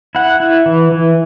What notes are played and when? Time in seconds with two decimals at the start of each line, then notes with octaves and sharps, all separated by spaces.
0.15 E4 F#5
0.40 E4
0.66 E3
0.92 E3